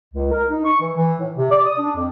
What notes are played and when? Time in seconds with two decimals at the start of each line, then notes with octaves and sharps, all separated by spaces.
0.14 C#2
0.31 A#4
0.50 D#4
0.65 C#6
0.81 E3
0.96 E3
1.20 A2
1.37 C3
1.51 D5
1.66 D#6
1.79 D4
1.96 F2